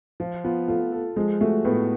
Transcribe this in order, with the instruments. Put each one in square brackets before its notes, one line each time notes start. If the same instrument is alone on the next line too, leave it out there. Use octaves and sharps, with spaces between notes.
[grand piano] F3 [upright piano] F4
[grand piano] B3 [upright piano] F4
[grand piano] A3 [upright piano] F4
[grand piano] A4
[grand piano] F3 [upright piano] G#3
[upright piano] A3 [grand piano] F#4
[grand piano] A2 [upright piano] B3